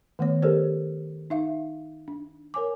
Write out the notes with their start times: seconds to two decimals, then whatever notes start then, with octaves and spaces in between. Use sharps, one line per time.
0.19 D#3 A3 B3 C#5
0.42 G4 A4 A#4 C5 D5
1.30 D#4 E5 F5
2.08 D4
2.54 A#4 C#5 G#5 D6